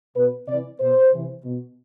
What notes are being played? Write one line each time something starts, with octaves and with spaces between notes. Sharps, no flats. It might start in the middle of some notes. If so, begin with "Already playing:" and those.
B2 B4
C3 E3 D5
B2 C5
C3 E3
B2